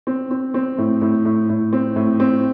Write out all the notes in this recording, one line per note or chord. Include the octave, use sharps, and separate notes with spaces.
C4
C4
C4
A2
A2
A2
A2
C4
A2
C4